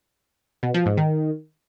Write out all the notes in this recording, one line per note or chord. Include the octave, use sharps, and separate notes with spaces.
B2
F3
G#2
D#3